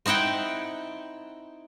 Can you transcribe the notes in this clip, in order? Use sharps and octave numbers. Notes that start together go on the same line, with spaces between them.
C4 D#4 E4 F#5 G5